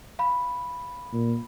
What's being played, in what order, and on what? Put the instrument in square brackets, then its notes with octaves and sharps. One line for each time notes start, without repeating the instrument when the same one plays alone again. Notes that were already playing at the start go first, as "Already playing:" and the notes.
[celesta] F5 B5
[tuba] A#2